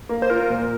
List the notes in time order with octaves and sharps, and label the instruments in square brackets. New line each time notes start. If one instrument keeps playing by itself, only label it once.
[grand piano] A#3
[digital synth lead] C5
[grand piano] F4 [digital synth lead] A#4
[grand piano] A#2